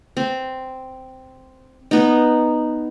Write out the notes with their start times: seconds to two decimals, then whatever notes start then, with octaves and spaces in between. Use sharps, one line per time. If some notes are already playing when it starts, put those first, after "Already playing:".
0.17 C4
1.91 B3 D#4